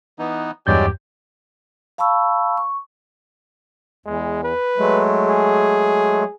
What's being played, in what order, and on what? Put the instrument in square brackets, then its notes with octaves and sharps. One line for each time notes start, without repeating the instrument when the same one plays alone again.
[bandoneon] E3 B3 D#4
[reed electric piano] E2 G2 G6 [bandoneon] F#3 G#3 D5 [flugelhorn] G4
[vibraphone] F5 A5 B5 C#6 E6
C#6
[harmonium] E2 [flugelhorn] G#3
[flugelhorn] B4
[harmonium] F#3 G#3 A3
[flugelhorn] G#4